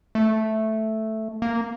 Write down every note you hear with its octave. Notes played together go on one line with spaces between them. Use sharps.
A3
A#3